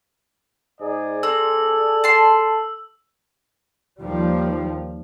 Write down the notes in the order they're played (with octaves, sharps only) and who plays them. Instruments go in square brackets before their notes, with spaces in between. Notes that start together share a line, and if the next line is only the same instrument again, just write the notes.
[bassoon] G#2 [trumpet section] G#4 D5
[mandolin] C4 [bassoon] A4 [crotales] E6
[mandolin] A5 C6
[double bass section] D#2 F3 G3